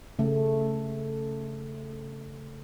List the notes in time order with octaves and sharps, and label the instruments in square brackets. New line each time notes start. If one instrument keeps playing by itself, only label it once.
[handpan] C#3 A3